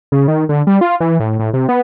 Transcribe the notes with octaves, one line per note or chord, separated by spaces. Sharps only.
C#3
D#3
D3
G3
F4
E3
A2
A2
C3
B3